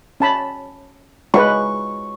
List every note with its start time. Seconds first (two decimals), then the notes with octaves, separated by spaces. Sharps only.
0.20 C#4 A5 B5
1.34 G#3 B4 C#6